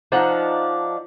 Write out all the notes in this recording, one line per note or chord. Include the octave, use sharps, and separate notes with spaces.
F3 D4 D#4 F#5